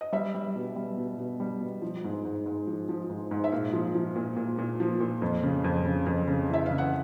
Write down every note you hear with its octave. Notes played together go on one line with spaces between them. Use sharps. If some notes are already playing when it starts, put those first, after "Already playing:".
D#5
G3 E5
G3
B2
G3
B2
B2
G3
B2
F3
G#2
G#2
G#2
F3
F3
G#2
G#2
E5
A#2 F5
F3
F3
A#2
A#2
A#2
F3
A#2
F2
C#3
F2
C#3
F2
C#3
E3 E5
C#3 F5
F#5